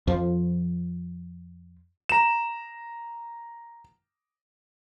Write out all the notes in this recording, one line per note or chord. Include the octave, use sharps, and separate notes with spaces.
F2 F3
A#5 E7